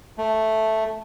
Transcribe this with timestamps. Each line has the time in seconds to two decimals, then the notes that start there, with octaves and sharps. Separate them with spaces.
0.18 A3